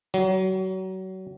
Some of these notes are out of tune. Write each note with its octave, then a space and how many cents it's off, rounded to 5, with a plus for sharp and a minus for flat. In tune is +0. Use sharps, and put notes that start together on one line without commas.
F#3 +30